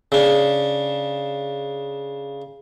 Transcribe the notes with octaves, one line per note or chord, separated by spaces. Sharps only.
C#3 D4